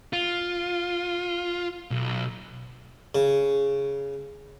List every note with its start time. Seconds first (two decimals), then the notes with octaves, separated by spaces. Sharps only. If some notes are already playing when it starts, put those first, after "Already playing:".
0.13 F4
1.91 B1
3.15 C#3